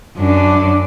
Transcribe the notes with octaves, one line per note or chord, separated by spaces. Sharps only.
F#2 D4